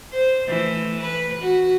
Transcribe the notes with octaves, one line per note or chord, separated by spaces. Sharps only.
C5
E3 A3
B4
F#4